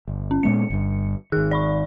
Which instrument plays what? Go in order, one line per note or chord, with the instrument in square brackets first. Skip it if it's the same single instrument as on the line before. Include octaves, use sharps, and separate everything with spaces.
[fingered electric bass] G1
[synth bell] C#4
[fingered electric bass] A#2 G#3 B3 [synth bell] C#7
[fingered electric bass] G1 G2
[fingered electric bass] G#1 D#3 [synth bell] G#4 F#6
[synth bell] D5 B5 C#6